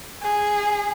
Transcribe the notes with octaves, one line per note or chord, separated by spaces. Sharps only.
G#4